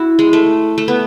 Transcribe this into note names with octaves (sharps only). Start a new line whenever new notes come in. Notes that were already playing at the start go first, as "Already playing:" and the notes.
Already playing: E4 F#4
G#3
A3
A3
B3